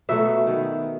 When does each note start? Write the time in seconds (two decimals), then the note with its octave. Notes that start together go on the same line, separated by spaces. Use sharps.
0.09 B2 F#3 A3 E5
0.47 D#3 F#3 B3